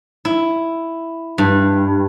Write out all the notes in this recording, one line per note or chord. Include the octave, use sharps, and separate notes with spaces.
E4
G2